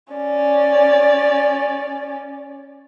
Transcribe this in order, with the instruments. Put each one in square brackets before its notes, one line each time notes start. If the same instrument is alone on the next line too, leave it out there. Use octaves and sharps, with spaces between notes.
[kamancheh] C#4 D5